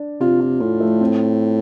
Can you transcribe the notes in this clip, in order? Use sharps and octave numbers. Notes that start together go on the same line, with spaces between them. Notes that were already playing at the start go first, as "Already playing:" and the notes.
Already playing: D4
C3 F4
F4
A2 F4
A3
C4